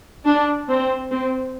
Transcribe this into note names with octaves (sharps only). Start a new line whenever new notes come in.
D4
C4
C4